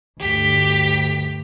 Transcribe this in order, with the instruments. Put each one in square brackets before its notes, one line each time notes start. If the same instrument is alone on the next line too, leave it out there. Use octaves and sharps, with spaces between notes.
[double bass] D2 G2 [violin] G4 B6